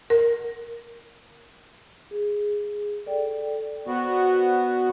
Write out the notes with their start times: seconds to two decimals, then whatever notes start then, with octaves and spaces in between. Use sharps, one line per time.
0.10 A#4
2.11 G#4
3.06 A4 D5 G5
3.87 B3 F#4 C5 D5